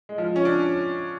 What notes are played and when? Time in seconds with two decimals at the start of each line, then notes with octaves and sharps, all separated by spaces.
0.09 G#3
0.18 F3
0.36 C#4
0.45 D4